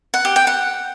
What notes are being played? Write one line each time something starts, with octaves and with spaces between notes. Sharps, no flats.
F#5
G4
G5
F#5